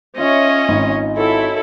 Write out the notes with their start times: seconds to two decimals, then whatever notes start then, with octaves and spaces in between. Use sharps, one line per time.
0.18 C#4 F4 D#5 E5 G#5
0.68 G#1 D#4
1.17 E4 F#4 A4 C#5